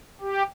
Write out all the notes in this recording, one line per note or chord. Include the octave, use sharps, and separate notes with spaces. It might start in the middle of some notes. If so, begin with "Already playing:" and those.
G4